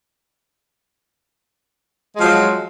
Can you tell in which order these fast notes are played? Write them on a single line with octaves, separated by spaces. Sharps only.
G#3 F3 F#3